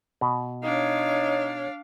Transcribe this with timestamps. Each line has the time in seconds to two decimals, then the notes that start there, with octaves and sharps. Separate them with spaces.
0.21 B2
0.63 D4 D#4 C#5 F5